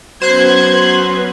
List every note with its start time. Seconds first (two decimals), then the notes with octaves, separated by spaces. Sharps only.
0.22 F#3 B3 C#4 B4 C5 C6 F#6 G#6